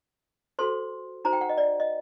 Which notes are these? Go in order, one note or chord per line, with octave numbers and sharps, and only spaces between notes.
F#4 A4 C5 C6
D#4 F#4 C5 A#5
G5
F#5
D#5
D5
D#5